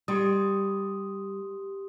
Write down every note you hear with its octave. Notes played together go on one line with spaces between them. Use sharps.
G3 G4 C6 D#6